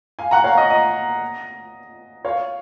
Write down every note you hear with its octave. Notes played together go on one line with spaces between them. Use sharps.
F5 G#5
F#5 A#5
C#5 F5
D#5
D#5
C#5 F5